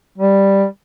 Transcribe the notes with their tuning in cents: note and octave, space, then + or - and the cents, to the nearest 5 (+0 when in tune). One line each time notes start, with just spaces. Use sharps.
G3 +5